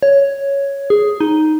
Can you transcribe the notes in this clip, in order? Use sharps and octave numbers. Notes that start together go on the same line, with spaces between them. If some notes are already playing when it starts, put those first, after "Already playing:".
C#5
G#4
D#4